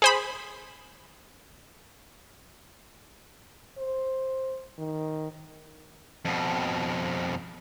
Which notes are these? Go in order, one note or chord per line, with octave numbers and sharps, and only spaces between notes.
G#4 C5 B5
C5
D#3
F2 B2